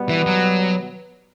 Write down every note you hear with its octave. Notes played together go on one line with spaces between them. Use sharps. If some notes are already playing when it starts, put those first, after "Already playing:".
Already playing: B2 G3 B3
E3
F#3